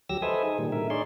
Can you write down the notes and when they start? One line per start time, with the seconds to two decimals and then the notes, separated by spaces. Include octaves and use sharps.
0.09 D2 F#3 G4 E6 A#6
0.22 A4 B4 C5 D#5 E5 G#5
0.43 D#4 G#4
0.58 A#2 D#3 G3
0.72 A2 D3 A#4 E5
0.90 D#4 G#4 C#5 D5 C6